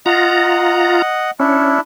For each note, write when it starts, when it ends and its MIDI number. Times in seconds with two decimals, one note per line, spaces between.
0.06 1.02 65
0.06 1.31 75
0.06 1.31 78
0.06 1.02 82
1.40 1.78 61
1.40 1.80 62
1.40 1.80 64